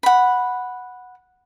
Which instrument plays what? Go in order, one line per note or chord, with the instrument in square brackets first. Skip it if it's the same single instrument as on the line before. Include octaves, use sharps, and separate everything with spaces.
[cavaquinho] F#5 B5